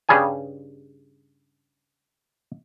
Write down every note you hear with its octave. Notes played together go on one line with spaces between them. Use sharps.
G2 C#3 G3 G#4 G#5